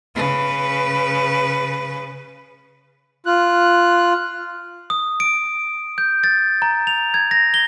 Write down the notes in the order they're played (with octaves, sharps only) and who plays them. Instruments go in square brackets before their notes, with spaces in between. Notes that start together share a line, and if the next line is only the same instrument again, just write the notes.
[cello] C#3 B4
[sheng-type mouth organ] F4 F#6
[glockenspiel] D#6
D7
G6
A6
A#5
F7
G#6
A#6
G7